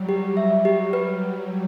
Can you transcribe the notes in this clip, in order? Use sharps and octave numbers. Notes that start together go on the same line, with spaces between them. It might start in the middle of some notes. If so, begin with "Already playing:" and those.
Already playing: F#3 G3
G4
E5
G4
B4